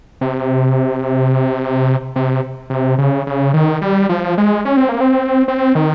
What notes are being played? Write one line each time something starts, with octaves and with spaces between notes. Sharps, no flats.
C3
C3
C3
C#3
C#3
D#3
G3
F3
G#3
C#4
C4
A#3
C4
C4
D#3